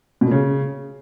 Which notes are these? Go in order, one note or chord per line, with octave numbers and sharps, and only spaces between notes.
B2
A#2
C#3